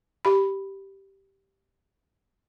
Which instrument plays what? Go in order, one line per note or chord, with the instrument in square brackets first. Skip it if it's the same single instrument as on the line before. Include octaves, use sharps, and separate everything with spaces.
[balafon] G4 B5